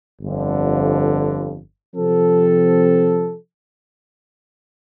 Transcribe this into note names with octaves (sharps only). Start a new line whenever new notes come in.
G1 F2 D3
C3 F3 C4 A4